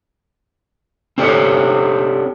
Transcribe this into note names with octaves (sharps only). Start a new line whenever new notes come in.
C4 D4 G4 A4 C#5